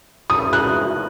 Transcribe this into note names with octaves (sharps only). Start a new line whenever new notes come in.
D#6
F#6